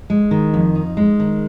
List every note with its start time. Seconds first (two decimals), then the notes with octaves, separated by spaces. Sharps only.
0.10 G#3
0.31 D#3
0.54 F2
0.75 D#4
0.97 G#3
1.20 D#3